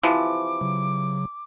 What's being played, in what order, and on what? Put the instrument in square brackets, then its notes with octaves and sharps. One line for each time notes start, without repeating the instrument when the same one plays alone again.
[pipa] C3 E3 F3 [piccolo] D6
[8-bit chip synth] C#3 F#3